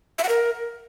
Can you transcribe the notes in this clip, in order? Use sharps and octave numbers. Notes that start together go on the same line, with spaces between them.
E5
F#5
A#4